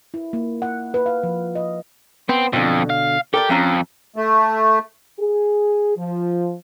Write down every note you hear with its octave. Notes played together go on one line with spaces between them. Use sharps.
E4
A#3
F#5
B4
F5
F3
D#5
B3 C4
F2 B2 D3
F5
G4 A4 A#4 D5
F2 F3 C#4 A#5
A3
G#4
F3